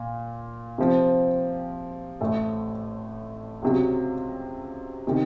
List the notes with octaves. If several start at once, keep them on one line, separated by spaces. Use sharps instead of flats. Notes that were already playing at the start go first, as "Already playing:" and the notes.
Already playing: A#2
C3 F3 C4
A1 A2 A3
C#2 C3 F#3
C3 D#3